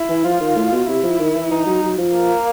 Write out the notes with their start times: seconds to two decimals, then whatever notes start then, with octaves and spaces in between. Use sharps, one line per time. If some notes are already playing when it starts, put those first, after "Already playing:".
Already playing: E4
0.09 E3
0.25 F3 F4
0.40 D#3
0.56 A2
0.72 B2
0.88 C3 E4
1.03 F3
1.19 D#3
1.35 E3
1.51 E3 D#4
1.66 F#3
1.82 F#3
1.98 F3
2.15 A#3